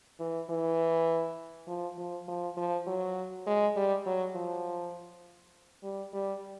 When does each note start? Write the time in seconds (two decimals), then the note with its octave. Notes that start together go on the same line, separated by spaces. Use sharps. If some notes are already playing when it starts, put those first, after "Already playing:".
0.20 E3
0.50 E3
1.67 F3
1.98 F3
2.28 F3
2.57 F3
2.87 F#3
3.47 G#3
3.76 G3
4.06 F#3
4.35 F3
5.83 G3
6.13 G3